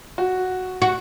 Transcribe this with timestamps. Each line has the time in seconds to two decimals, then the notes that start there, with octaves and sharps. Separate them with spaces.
0.18 F#4
0.82 F#4